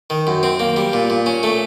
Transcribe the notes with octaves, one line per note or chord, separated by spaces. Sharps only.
D#3
F#2
C4
A#3
G3
A#2
A#2
C#4
A3